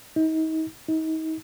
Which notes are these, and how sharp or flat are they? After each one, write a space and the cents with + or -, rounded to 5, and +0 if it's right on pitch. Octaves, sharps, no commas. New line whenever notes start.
D#4 +35
D#4 +35